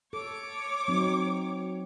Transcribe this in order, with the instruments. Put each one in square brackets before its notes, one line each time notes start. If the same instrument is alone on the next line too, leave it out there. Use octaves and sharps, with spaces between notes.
[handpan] A4 [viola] C#5 D6
[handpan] F#3 C4 D#4